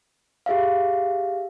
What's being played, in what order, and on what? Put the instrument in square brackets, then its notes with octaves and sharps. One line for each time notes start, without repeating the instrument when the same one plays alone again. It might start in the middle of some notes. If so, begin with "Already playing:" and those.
[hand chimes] G4 G#4 E5 F5